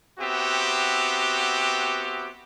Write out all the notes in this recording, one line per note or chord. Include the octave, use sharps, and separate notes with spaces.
B3 C4 F#4 G4 E5